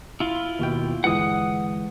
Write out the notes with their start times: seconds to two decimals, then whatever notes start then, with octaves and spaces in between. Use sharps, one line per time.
0.20 E4 F4
0.59 D#2 B2 G5
1.04 G1 E3 G#3 F#5 D#6